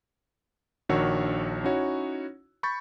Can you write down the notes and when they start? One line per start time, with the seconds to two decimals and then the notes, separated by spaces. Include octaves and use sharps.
0.89 A#1 D#3 D4 F#4 C#5 E6
1.64 C#4 D#4 E4 F#4 C#5
2.63 B5 C#6 G6 A6